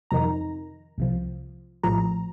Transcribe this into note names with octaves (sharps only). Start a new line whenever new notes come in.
F2 C3 D#3 A#5
C2 C3 F3
A#1 A2 F3 A#5